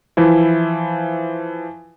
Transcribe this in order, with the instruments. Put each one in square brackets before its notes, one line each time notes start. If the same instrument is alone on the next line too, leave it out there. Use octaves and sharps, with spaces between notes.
[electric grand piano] E3 F3 E4